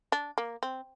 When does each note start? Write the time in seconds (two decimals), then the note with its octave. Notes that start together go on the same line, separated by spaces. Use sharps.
0.12 D4
0.38 A#3
0.63 C4